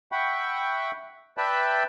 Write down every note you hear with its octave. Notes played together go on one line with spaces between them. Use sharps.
E5 F#5 G5 B5 C#6
B4 D5 E5 G5 A5 B5